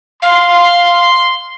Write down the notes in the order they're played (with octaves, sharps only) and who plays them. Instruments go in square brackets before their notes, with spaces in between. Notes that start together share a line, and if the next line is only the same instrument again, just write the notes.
[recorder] F5 [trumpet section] C6